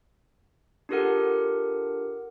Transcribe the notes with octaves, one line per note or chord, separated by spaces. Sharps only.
D4 F4 G4 A4 A#4 F#5